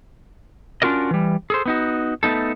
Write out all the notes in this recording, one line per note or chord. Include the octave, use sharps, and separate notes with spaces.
C#4 D4 F4 F#4 A#4 D#5
E3 G3
G#4 A4 C5
B3 D#4 F#4
A3 B3 D#4 A4